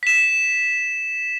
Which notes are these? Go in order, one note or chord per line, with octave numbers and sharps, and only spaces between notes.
B6 E7